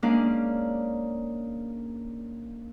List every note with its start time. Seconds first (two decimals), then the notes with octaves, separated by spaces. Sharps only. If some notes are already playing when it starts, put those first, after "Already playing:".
0.02 G#3 A#3 C#4 D4 D5 F5